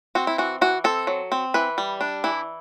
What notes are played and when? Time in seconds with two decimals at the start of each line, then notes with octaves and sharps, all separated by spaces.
0.15 C4 F#4
0.27 E4
0.38 E3 F#4
0.61 E3 F#4
0.84 C4 A4
1.07 F#3
1.32 C4
1.54 E3 B4
1.78 G3
2.01 D4
2.24 E3 E4